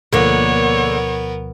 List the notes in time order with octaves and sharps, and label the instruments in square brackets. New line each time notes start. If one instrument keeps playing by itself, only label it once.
[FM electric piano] D2 B2 F3 [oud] D3 A#3 [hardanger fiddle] B3 A#4 [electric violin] C#5